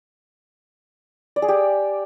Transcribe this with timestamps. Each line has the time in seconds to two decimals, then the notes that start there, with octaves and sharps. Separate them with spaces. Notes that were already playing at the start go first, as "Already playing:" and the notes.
1.36 D5
1.42 G#4
1.48 G4